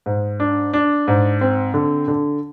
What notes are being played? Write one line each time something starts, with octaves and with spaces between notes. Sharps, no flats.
G#2
D4
D4
G#2
C4
D3
D3